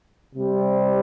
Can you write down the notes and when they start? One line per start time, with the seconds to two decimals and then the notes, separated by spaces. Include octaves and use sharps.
0.34 C3 G3 C4